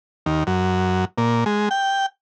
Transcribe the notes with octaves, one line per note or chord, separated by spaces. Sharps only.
D#2
F#2
A#2
G#3
G5